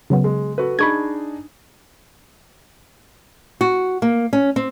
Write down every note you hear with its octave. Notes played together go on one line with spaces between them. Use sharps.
C#3 F#3 B3
G#3
F#4 A4 B4
D4 D#4 G#4 B5 C#6 G#6
F#4
A#3
C#4
C4